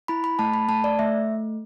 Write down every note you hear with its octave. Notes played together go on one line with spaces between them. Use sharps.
E4 B5
B5
A3 A5
B5
A3 A5
D5
A3 E5